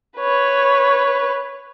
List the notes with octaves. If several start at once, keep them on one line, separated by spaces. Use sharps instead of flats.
B4 C#5